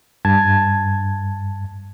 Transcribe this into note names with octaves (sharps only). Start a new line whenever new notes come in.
G2 A5 G#6